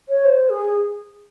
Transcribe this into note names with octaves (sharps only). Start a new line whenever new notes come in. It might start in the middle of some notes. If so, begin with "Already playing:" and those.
C#5
C5
G#4